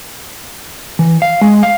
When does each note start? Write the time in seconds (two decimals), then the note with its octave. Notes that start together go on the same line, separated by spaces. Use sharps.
0.99 E3
1.22 F5
1.41 G#3
1.63 F5